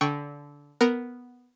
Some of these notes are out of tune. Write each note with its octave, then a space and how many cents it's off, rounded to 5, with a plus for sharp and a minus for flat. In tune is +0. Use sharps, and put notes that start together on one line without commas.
D3 -20 G5 -15 C#6 +0
B3 +0 A#4 +0